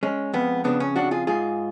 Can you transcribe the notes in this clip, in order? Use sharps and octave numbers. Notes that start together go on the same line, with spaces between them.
G#3 C#4
F2 B3
C#3 B3 D4
C#4
F2 D4 F#4
F4 G#4
G#2 F4 G#4